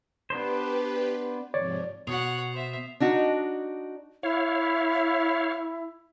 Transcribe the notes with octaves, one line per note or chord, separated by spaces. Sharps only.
B3 D4 G4 B4 C5
G#2 C3 F3 C#5 D5
B2 C#5 F#5 D#6 C7 F7
C5 E5
D4 D#4 F#4
E4 C#5 F5